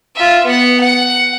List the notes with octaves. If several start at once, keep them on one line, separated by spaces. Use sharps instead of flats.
F4 E5
B3 F#5
F#5